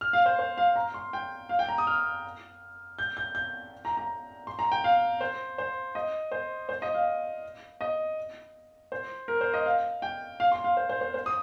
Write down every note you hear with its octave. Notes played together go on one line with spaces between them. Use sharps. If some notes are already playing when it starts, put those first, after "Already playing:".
F6
F5
C5
C5
F5
A#5
C6
G5
F5
G5
A#5
D#6
F6
G6
G6
G6
A#5
A#5
C6
A#5
G5
F5
C5
C5
D#5
C5
C5
D#5
F5
D#5
C5
A#4
C5
D#5
F5
G5
F5
C6
F5
C5
C5
C5
C5
D#6